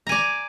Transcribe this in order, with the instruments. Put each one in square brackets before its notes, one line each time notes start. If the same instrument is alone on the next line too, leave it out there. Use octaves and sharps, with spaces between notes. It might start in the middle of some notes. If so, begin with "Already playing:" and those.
[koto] A#5
G#5
D5